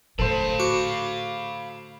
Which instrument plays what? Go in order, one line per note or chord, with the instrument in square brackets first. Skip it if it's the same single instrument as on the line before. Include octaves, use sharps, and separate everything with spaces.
[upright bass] A2 D3 [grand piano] A4 C5 [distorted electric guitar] F5 B5
[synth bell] F#4 C#6 D6